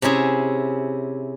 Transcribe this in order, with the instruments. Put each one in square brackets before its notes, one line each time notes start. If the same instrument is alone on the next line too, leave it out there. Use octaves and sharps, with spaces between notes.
[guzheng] C3 C#4 E4 G#4